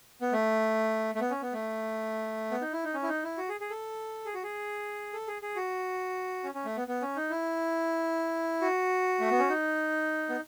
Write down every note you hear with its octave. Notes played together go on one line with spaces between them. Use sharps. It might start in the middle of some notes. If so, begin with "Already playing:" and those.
B3
A3
A3
B3
C#4
B3
A3
B3
D#4
E4
D#4
C#4
E4
D#4
E4
F#4
G#4
G#4
A4
G#4
F#4
G#4
A4
G#4
G#4
F#4
C#4
C#4
A3
B3
B3
C#4
D#4
E4
F#4
A3
B3
C#4
D#4
B3